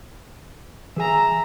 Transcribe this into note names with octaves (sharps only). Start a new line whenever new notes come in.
E3 G#4 E5 G#5 A#5